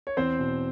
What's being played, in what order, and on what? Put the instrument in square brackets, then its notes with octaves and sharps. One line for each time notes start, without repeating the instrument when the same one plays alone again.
[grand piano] C#5
E2 C4 C5
B2